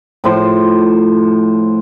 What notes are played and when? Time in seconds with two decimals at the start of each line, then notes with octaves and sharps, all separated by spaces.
0.24 A2 F3 C5 C6